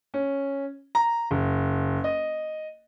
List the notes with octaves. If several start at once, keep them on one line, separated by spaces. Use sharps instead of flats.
C#4
A#5
F#1
D#5